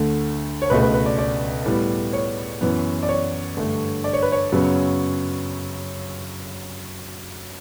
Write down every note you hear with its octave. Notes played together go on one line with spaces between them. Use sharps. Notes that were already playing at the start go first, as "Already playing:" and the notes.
Already playing: D2 D3 A3
C#5
C#2 B2 A3 B4
B4
B4
D5
D5
A2 G3 B3
C#5
F#2 E3 B3
D5
C#5
G2 D3 A3
D5
C#5
B4
C#5
F#2 C#3 F#3 B3